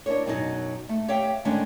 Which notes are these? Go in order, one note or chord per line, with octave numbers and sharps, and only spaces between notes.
D4 E4 A#4 C#5
F#2 B2 F#3 D#4 A#4 D#5
A3
G4 C#5 E5 F5 G5
D3 D#3 G#3 A3 C#4 D4